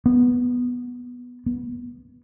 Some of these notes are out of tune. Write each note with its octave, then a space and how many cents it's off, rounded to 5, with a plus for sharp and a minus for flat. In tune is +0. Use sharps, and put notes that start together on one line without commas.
B3 -5
B3 -25